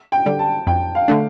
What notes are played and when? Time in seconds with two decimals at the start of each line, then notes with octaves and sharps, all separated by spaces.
0.12 G5
0.26 D3 G3
0.39 A5
0.67 F2 G5
0.95 F5
1.08 D3 A3 D4